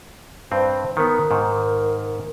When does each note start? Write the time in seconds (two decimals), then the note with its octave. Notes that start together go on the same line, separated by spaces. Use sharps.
0.52 G2 C4 C5
0.97 D#3 B3 A#4
1.31 G#2 D#3